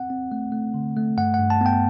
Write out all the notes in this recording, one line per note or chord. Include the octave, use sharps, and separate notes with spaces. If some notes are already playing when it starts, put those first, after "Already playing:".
Already playing: C4 F#5
C4
A3
A3
D3
A3
G2 F#5
G2 F#5
A5
B3 G5